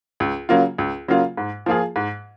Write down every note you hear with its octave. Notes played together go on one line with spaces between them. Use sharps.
C#2
C#3 F#3 A#3 F4
C#2
C#3 F#3 A#3 F4
G#2
F3 A#3 F4 G#4
G#2